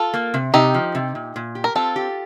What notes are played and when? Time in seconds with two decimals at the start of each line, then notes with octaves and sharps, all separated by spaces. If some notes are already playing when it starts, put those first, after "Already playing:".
Already playing: F4 A4
0.14 A#3
0.34 C3
0.54 C3 D#4 G4
0.74 F3
0.95 C3
1.15 A#2
1.36 A#2
1.55 G4
1.64 A#4
1.75 C4 F4 A4
1.96 G4